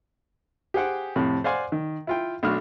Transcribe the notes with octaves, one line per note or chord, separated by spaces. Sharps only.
G4 G#4 C5 F#5 G5
F2 A2 C3
C5 D5 F5 F#5 G#5 C6
D#3
E4 F4 G5
B1 A3 D4 F#4 F6